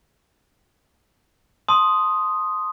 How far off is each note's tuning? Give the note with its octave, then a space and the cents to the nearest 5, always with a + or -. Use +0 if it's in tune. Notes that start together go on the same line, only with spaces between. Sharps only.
A5 -5 C6 +5 D#6 +0